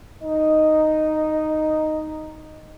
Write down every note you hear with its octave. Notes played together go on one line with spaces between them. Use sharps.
D#4 D#5